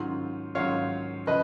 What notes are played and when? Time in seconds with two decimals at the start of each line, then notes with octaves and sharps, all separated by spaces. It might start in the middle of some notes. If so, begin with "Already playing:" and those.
Already playing: G#2 D#3 F#3 C#4 F4
0.55 G#2 D#3 F#3 C#4 F4 C#5 F5
1.27 C#3 F3 B4 D#5